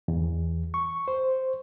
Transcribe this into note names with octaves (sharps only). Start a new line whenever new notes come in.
E2
C#6
C5